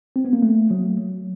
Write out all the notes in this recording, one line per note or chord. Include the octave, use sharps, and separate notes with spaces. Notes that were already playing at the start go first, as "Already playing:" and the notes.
C4
B3
A#3
A3
F#3